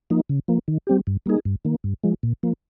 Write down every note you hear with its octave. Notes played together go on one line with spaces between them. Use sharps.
F3 A#3 D#4
C#3
F3 A#3
D#3
G3 C4 G4
G2
G3 A#3 D#4 G#4
G2
D#3 A#3
G2
F3 G#3
A#2
F3 A#3